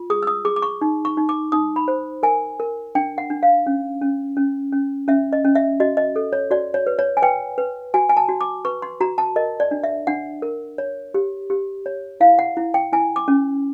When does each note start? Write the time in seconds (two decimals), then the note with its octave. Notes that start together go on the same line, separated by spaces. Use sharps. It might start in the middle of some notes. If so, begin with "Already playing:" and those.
Already playing: F4
0.10 G#4 D#6
0.23 E6
0.27 D#6
0.45 G#4 D6
0.56 D6
0.62 C#6
0.81 D#4
1.05 C#6
1.17 D#4
1.29 D6
1.52 D#4 D#6
1.76 B5
1.88 C5
2.23 A#4 G#5
2.60 A#4
2.95 D4 G5
3.18 F#5
3.30 D4
3.43 F5
3.67 C#4
4.01 C#4
4.37 C#4
4.72 C#4
5.08 C#4 E5
5.33 D#5
5.45 C#4
5.55 E5
5.80 F#4 D#5
5.97 D#5
6.16 A4
6.33 C#5
6.51 F#4 D5
6.74 C#5
6.87 B4
6.99 C#5
7.17 G#5
7.22 B4 G5
7.58 B4
7.94 F#4 G#5
8.09 G#5
8.17 A5
8.29 F#4
8.41 D6
8.65 B4 C#6
8.82 C6
9.00 F#4 A#5
9.18 A5
9.36 A#4 D#5
9.60 D5
9.71 D4
9.84 E5
10.07 D4 F#5
10.42 A#4
10.78 C#5
11.14 G4
11.50 G4
11.86 C#5
12.20 E4 F5
12.39 F#5
12.57 E4
12.74 G5
12.93 E4 G#5
13.16 D6
13.28 C#4